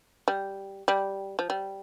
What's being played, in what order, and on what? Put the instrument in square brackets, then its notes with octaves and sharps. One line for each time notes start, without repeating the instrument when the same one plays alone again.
[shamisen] G3
G3
F3
G3